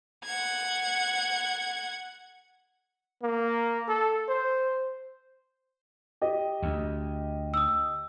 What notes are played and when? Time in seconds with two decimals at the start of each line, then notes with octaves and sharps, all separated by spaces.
0.25 F#5 G#6
3.22 A#3
3.88 A4
4.28 C5
6.21 G4 D#5
6.62 D2
7.54 D#6 E6